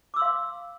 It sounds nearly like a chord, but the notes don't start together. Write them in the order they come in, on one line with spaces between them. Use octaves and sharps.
D6 E6 C6 F5